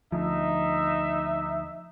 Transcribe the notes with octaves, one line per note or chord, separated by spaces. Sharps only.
D2 F3 D#4 E5